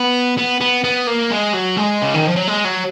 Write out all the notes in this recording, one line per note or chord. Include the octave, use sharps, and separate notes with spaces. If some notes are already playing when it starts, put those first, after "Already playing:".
Already playing: B3
B3
B3
B3
A#3
G#3
F#3
G#3
C#3
D#3
F3
F#3
G#3
F#3